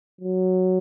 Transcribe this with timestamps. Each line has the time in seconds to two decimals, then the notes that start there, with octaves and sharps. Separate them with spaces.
0.21 F#3